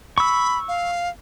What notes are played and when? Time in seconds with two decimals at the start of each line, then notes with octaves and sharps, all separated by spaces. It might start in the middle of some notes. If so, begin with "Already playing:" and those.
0.18 B5 C#6 E6
0.68 F5